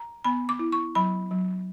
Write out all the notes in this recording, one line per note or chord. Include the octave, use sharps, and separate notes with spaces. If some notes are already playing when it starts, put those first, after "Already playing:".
Already playing: A#5
B3 B5
D6
E4
C#6
F#3 B5
F#3